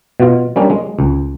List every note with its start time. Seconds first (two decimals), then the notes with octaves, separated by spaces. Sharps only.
0.20 B2 F4
0.56 G3 A#3 C#4 D4
0.70 G#3
0.99 C#2